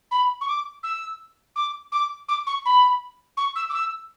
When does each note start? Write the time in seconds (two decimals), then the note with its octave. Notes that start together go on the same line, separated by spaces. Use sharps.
0.11 B5
0.41 C#6
0.48 D6
0.83 E6
1.56 D6
1.92 D6
2.28 D6
2.46 C#6
2.65 B5
3.37 C#6
3.55 E6
3.69 D6
3.74 E6